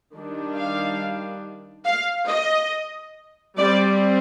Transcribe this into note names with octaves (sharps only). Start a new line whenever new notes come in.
D#3 G3 D4
F5
F5
D#5
G3 C4 D5